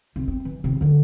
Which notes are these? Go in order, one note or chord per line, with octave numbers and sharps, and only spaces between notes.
C2
C4
E3
C3 D#3
D3 E3